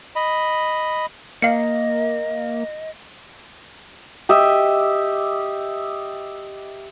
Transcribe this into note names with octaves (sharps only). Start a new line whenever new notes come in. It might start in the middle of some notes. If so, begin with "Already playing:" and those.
D#5 B5
A#3 D#5 F5 C#7
G4 D#5 E5